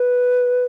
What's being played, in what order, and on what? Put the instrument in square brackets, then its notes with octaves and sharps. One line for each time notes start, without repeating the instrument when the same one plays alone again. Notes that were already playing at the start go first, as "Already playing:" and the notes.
Already playing: [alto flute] B4